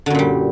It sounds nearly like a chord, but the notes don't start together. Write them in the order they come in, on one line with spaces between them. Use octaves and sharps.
D3 F#2 A#2 G3